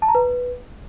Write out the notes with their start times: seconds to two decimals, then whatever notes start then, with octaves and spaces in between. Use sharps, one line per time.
0.02 A5
0.08 A#5
0.15 B4